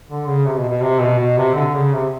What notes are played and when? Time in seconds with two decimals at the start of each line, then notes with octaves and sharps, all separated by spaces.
0.09 D3
0.27 C#3
0.46 C3
0.58 B2
0.69 B2
0.82 C3
1.00 B2
1.19 B2
1.38 C3
1.55 D3
1.74 C#3
1.93 C3